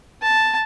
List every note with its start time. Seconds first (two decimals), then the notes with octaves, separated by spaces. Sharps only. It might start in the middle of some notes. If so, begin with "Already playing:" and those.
0.22 A5